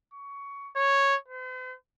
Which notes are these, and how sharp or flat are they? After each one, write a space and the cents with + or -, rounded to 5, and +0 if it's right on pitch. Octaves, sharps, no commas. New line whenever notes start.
C#6 +20
C#5 -5
C5 -45